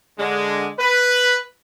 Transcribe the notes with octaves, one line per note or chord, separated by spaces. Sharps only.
D3 G#3
B4